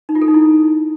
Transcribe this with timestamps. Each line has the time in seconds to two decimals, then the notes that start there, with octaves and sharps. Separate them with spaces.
0.09 D#4
0.15 F4
0.22 A4
0.28 D#4
0.34 E4